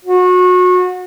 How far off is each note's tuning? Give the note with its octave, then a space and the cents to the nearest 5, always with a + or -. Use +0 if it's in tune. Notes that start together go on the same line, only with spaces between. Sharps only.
F#4 -30